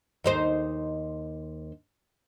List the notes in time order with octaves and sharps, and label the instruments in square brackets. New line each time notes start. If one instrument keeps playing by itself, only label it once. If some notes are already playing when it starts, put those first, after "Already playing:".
[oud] D#2 D#4 C5